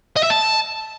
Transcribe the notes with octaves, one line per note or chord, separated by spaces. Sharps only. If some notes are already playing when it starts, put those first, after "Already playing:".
D#5
E5
A5